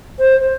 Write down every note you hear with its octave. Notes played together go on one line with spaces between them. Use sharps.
C5